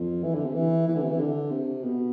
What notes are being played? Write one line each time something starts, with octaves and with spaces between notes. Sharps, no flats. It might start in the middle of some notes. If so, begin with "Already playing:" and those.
Already playing: F2
E3
D3
C3
E3
E3
D3
C3
E3
D3
C3
B2